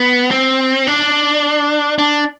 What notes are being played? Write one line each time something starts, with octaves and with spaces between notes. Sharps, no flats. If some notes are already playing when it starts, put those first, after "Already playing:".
Already playing: B3
C4
D4
D4